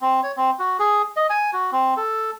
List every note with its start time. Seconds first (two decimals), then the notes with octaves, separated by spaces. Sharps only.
0.01 C4
0.23 C#5
0.37 C4
0.59 F#4
0.79 G#4
1.17 D#5
1.30 G#5
1.53 F#4
1.72 C4
1.97 A4